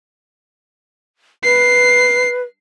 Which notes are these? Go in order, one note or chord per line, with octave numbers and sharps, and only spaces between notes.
B4 C7